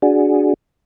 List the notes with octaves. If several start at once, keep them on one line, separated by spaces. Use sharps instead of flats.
D4 F#4 G#4